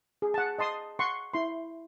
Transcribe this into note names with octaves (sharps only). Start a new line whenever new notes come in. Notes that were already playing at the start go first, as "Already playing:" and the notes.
G#4
F#5 A5
D#5 A5 C6 D#6
F#5 C6 C#6
E4 C6